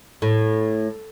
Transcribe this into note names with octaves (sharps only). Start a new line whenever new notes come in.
A2